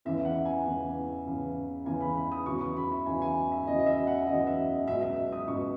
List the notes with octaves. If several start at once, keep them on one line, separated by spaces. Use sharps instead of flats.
E2 C#3 E3 E5
F#5
G#5
E2 C#3 E3
E2 C#3 E3
E2 C#3 E3 G#5
B5
B5
D#6
E2 C#3 F#3 C#6
C#6
B5
E5
E2 C#3 F#3 G#5
G#5
E5
E2 C#3 F#3 D#5
D#5
E5
F#5
E2 C#3 F#3 D#5
E5
D#5
C#2 B2 F#3 E5
E5
D#6
C#2 B2 F#3 C#6